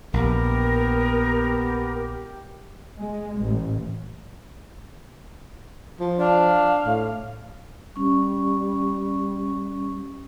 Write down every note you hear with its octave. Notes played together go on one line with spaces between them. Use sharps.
A#1 B3 G4 A#4
G#3
A1
F3
D4 F5
A2
G3 C#4 C#6